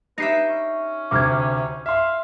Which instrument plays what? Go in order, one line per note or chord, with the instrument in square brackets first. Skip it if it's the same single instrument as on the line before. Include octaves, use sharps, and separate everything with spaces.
[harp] D#4 G4 E5 [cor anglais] B4 [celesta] A#6 C7
[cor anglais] C#4
[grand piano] D2 C3 [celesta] D6 F6 G#6
[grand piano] E5 C6 [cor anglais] F5